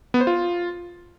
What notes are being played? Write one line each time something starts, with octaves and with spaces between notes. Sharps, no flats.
B3
C5
F4